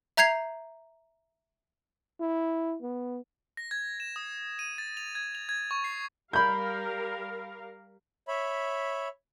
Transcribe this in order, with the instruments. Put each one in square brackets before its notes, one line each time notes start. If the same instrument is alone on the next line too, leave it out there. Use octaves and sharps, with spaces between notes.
[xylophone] E5 A#5 G6 G#6 C7 F7
[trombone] E4
B3
[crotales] A#6
G#6
E7
D#6
D#7
A6
F7
G#6
F7
G#6
C#6
C7
[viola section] G3 A#4 F5 [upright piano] B5 G6
[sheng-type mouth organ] C#5 E5 B5